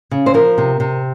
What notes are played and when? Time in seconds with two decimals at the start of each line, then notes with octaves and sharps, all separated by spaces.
0.11 C#3
0.26 C5
0.34 F3 A#4
0.58 C3
0.80 C3